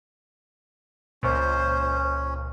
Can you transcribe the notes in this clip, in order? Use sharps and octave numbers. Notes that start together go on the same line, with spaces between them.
C#2 A#2 C#4 C5